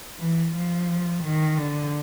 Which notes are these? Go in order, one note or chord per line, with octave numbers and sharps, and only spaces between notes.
E3
F3
D#3
D3